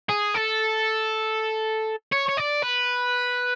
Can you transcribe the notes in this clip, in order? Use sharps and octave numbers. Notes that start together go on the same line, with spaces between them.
G#4
A4
C#5
C#5
D5
B4